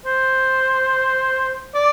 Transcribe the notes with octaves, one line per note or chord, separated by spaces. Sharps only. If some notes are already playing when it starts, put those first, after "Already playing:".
C5
D5